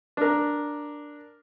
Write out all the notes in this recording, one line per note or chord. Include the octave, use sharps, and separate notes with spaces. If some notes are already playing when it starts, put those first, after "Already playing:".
D4 A#4